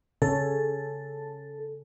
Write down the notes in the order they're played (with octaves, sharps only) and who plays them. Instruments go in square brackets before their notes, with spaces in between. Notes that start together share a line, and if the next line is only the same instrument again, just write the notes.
[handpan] C#3 C#4 [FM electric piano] A4